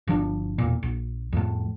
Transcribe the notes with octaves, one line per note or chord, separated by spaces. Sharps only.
G1 F3 D4
E1 A#2
A#1
F2 A2